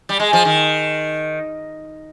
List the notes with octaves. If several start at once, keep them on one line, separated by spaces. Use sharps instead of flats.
G3
G#3
F3
D#3